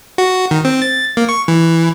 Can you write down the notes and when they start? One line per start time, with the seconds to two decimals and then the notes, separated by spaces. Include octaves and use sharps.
0.18 F#4
0.51 D#3
0.65 C4
0.82 A6
1.17 A#3
1.29 C#6
1.48 E3